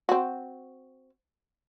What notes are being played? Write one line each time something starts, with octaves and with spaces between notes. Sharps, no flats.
C4 F#4